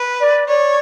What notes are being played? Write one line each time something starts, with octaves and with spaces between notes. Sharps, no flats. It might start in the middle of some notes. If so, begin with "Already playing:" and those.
Already playing: B4
D5
C#5 D5